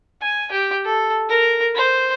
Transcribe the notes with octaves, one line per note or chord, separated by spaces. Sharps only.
G#5
G4
A4
A#4
C5